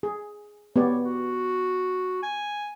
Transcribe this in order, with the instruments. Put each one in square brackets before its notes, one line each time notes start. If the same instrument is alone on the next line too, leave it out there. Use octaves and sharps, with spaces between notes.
[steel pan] G#4
[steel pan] B3 G4 D5 [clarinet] C#5
[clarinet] F#4
G#5